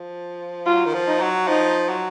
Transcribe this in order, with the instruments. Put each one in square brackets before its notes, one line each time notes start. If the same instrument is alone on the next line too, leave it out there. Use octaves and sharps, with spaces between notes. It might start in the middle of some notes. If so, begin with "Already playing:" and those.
Already playing: [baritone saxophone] F3
[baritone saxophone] F#3 [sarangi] F4
[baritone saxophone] D#3
F3
[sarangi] D#4
[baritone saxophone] F#3
[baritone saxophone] F3 [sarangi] D#4
[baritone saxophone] F#3